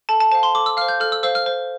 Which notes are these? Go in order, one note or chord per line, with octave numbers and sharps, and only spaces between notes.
A4 A5
A5
C5 F5 A5
C6
A4 D6
E6
C5 F5 F6
G6
A4 F6
E6
C5 F5 E6
F6
C5